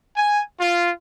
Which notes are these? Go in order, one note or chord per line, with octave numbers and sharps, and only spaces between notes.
G#5
F4